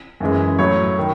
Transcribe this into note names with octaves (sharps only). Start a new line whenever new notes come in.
F#2 E3 G#3
A2 F#3 C#5
D#3